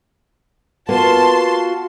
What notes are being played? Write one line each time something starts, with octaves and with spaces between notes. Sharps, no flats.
A#3 B3 F4 F#4 A5 C6